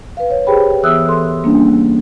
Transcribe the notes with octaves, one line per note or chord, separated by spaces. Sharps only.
B4 F5
C#5
G4 G#4 B4 C5 G5 B5
E3 B3 E5 D#6 E6 F#6
A4 C6
G3 A#3 C#4 D4